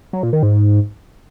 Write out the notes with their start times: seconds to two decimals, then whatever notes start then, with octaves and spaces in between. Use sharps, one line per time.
0.13 F#3
0.23 A#2
0.33 D#3
0.43 G#2